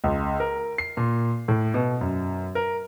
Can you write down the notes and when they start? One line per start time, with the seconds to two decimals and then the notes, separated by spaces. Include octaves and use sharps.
0.04 C#2
0.40 A#4
0.78 C7
0.97 A#2
1.48 A2
1.74 B2
2.01 F#2
2.55 A#4